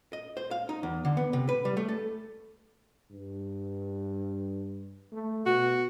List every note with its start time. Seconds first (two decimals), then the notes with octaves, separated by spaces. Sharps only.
0.13 D#5
0.37 C5
0.51 F5
0.69 D#4
0.83 E2
1.05 D3
1.17 B3
1.33 C3
1.49 B4
1.65 G3
1.77 A3
1.88 A4
3.11 G2
5.13 A3
5.46 B2 F#4